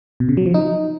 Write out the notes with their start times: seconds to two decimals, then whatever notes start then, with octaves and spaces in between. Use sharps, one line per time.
0.20 B2
0.29 C#3
0.37 F#3
0.46 F3
0.54 D#4